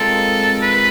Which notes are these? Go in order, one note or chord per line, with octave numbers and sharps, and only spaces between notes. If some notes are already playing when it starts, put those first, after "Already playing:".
Already playing: G#3 C4 F4 A4 A#4
B4